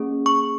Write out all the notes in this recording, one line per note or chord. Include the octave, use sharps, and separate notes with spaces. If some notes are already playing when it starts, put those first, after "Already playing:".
Already playing: A#3 C#4 G#4
C#6